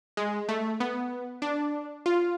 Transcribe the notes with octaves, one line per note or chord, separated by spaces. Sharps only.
G#3
A3
B3
D4
F4